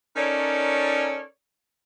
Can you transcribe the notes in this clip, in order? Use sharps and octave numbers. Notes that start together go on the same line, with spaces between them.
C#4 D#4 A4 A#4 C#5 D5